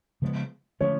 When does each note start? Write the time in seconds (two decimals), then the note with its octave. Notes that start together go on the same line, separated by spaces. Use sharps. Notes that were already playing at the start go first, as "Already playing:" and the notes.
0.22 C#3 F3 G#3 B3
0.81 D3 F3 A3 C#4 C#5